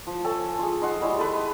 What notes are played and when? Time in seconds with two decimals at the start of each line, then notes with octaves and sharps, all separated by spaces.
0.07 F3
0.24 A4 C#5 G#5 A5
0.59 F4 G#4
0.81 D#4 C5 F#5
1.01 G3 G#3 E4 C#5
1.17 G#3 A4 B4